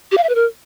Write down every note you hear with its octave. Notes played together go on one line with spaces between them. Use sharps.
G4
F5
E5
B4
A#4